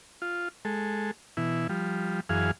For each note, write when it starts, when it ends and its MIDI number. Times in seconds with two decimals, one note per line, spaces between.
0.22 0.48 65
0.65 1.11 56
0.65 1.11 69
1.37 1.67 47
1.37 1.67 52
1.37 1.67 64
1.69 2.20 53
1.69 2.20 55
2.29 2.51 42
2.29 2.51 52
2.29 2.51 68
2.29 2.51 77